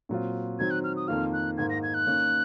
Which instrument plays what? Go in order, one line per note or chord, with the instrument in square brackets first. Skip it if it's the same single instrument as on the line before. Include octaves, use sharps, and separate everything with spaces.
[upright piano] A#2 F#3 C4 F4
[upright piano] D#3 F#3 C4 [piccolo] G#6
[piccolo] F#6
F6
D#6
[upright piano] F2 D#3 A#3 F4 [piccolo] F6
[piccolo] F#6
[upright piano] G#2 D#3 A#3 [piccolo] G#6
[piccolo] A#6
G#6
F#6
[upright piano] D#3 A#3 C#4